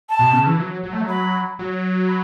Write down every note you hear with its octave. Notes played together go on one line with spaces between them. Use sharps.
A5
B2
C#3
E3
F#3
F#3
A3
F#3
B5
F#3
B5